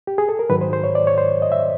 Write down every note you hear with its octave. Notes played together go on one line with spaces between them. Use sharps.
G4
G#4
A4
A#4
G#2 D#3 F#3 B4
C5
C5
C#5
D5
C#5
C5
D#5
E5